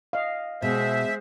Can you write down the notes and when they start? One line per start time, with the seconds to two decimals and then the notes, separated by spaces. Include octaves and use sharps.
0.13 D#5 F5
0.62 B2 G#3 B3 C5 E5